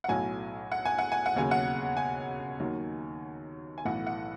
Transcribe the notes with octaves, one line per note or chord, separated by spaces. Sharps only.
F#5
B1 A2 F#3 G#5
F#5
G#5
F#5
G#5
F#5
E1 D#2 C#3 F#3 G#5
F#5
G#5
D#2 D#3 F#3
G#5
B1 A2 E3 F#5
F#5